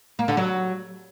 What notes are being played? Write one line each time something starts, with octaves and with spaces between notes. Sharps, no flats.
A#3
D3
F#3